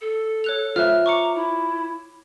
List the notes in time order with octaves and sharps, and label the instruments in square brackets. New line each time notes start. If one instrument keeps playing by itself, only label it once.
[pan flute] A4
[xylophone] C#5 F#6 F7
[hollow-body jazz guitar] F4 C5 E5 [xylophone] F6 F#6
[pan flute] A#5 [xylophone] C#6 D6 C#7
[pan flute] E4